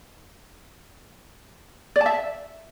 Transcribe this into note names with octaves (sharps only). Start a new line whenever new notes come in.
D5
A5
E5